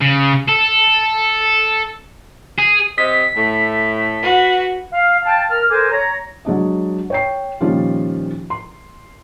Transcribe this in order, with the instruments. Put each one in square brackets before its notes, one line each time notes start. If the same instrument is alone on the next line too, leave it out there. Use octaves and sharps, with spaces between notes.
[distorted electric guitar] C#3
A4
G#4
[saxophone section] C3 D#5 [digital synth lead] B6
[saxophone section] A2 A3
[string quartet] F#4 B4
[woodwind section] F5
F5 G5 A5
A#4 F6
A4 A#4 C5 G#5 D6
C#5 A#5
[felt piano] F#3 G#3 D4 D#5
C#5 G5 C7
A#2 D#3 F3 G3 C#4 F4
C6